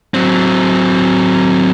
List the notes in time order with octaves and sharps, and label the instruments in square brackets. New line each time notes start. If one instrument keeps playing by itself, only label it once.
[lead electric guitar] F#3 C4